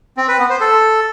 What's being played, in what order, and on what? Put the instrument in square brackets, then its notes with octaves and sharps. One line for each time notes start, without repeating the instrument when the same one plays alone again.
[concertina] C4
B4
B3
C5
A4